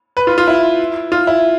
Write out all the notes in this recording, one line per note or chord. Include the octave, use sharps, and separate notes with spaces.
B4
F4
F4
E4
F4
E4